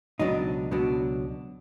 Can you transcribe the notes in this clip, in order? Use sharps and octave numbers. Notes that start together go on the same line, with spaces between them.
C#2 B2 F#3 B3 D4 D#4
C#2 B2 F#3 B3 D4